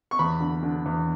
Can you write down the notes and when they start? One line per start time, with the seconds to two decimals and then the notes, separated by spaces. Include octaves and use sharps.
0.11 C#6
0.19 E2 B5
0.41 D3
0.63 D3
0.86 E2